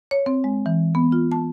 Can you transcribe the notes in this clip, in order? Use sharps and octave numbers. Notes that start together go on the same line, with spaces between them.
C#5
C4
G#3
E3
B3
F4
A5